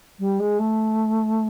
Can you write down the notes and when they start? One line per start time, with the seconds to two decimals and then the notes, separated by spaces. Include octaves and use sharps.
0.19 G3
0.39 G#3
0.59 A3